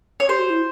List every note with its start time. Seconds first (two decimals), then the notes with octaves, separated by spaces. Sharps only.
0.20 C#5
0.28 G4 C5
0.39 F#4
0.50 E4